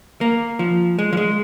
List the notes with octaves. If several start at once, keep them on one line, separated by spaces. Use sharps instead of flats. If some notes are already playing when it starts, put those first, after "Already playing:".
A#3
F3
G#3
F3
G#3